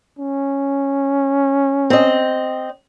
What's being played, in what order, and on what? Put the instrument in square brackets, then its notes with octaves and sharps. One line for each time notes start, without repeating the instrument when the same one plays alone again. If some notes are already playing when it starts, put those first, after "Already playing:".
[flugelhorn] C#4
[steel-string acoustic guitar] C4 D#5